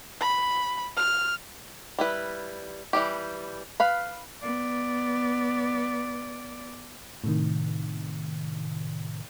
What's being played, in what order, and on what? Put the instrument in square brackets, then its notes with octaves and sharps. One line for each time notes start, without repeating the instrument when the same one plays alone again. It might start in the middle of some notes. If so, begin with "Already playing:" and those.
[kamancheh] B5
F6
[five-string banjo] G3 E4 B4
E3 G3 G4
B4 F5 B5
[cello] B3 D5
[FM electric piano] A2 C3 D#3